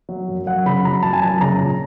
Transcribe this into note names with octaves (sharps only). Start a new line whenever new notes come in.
F#3
F#2
F#2 F#5
C#3 B5
F#3 A#5
F#2 A5
G#5
F#2 A5
C#3 A#5
A#2